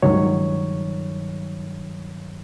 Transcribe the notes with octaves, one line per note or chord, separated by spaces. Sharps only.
C#2 G2 D#3 F#3 C#5